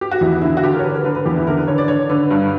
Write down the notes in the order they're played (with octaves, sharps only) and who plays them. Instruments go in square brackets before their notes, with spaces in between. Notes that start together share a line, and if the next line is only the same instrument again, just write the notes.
[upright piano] G4
F#4
E2 E4
E4
D3 E4
F#4
D3 G4
A#4
C#5
D3 B4
A#4
D3 B4
B4
E2 G4
E4
D3 A#4
B4
D3 C#5
D5
D3 C#5
D3 B4
G2